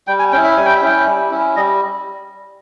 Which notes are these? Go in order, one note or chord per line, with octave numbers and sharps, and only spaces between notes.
G3 G5
G#5
C#4 E4 G5
E5
G3 G#5
G5
E5
C#4 E4 G5
G3
C#4 E4
G3 D#5